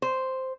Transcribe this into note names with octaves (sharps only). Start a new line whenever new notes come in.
C5